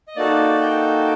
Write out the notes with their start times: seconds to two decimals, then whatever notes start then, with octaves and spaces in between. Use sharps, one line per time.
0.08 D#5
0.16 A#3 D#4 F#4 A4 D5
0.61 G5